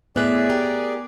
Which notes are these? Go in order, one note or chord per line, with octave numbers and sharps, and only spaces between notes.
A2 B3 G#4 D5 E5 F#6
G4 A#4